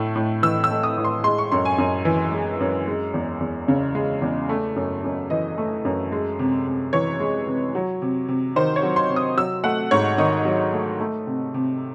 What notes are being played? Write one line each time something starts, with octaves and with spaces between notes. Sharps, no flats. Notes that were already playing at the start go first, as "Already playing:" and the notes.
Already playing: A2 A3
A2
E3 E6
E6
A3
D#6
A2
C6
G#3 C6
C#6
F#2 C6
G#5
F#2
E3
G#3
F#2
G#3
E2
E2
C#3
G#3
E2
A3
F#2
F#2
E3 D#5
A3
F#2
G#3
C3
C3
E3 C#5
G#3
C3
F#3
C3
C3
D#3 C5
C#5
F#3
C6
C3
D#6
F#3 E6
A3 F#5
G#2 C#5
D#3 D#5
F#3
A3
A3
C3
C3